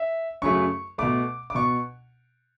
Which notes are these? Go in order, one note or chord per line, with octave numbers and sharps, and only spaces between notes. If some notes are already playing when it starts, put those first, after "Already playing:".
Already playing: E5
F#2 C#3 F#3 A3 C#6
B2 A3 D6
D6
B2 C#6